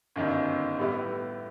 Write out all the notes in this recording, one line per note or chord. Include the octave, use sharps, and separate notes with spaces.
G1 F#2 D#3
A2 G3 B3 E4